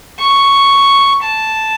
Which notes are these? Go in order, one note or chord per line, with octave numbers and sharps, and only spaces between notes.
C#6
A5